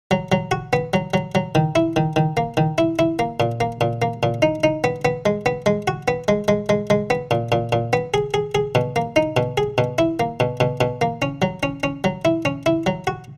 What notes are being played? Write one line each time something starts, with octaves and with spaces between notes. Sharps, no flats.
F#3
F#3
F#4
B3
F#3
F#3
F#3
D#3
E4
D#3
D#3
A#3
D#3
E4
E4
A#3
A#2
A#3
A#2
A#3
A#2
D#4
D#4
B3
B3
G#3
B3
G#3
F#4
B3
G#3
G#3
G#3
G#3
B3
A#2
A#2
A#2
B3
G#4
G#4
G#4
B2
A#3
D#4
B2
G#4
B2
E4
A#3
B2
B2
B2
A#3
C#4
F#3
C#4
C#4
F#3
E4
C#4
E4
F#3
F#4